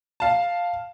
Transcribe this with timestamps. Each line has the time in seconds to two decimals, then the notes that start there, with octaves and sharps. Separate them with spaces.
0.20 F5 A5